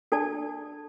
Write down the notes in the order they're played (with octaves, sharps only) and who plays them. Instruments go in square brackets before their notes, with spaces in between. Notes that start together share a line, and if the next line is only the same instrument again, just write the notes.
[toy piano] D4 A4 D5 A5